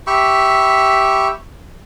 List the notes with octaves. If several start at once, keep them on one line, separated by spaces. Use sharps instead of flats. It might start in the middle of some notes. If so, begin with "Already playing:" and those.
G4 E5 B5 C#6